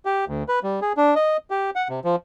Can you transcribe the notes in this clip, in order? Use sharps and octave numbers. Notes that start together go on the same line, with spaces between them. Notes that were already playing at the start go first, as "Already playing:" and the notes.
G4
D2
B4
G3
G#4
D4
D#5
G4
F#5
C3
F3